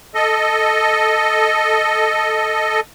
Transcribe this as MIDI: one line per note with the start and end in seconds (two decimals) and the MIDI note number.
0.15 2.80 69
0.15 2.80 75